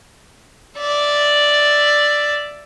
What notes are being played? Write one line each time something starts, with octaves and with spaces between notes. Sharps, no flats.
D5 E5